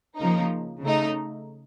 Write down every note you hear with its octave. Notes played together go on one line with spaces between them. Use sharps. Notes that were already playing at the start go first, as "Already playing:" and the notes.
C#3 F3 A#3 D#4
C#3 A3 D#4